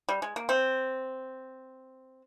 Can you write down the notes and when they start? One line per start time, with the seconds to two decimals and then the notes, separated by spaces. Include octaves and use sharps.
0.09 G3
0.22 G#3
0.36 A#3
0.49 C4